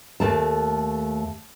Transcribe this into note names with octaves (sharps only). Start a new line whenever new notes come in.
D#2 A3 A5